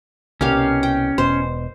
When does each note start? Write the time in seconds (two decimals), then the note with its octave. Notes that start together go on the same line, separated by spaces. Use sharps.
0.41 C2 B2 A#3 C#4 G4 F5
0.83 G5
1.18 E1 B2 C5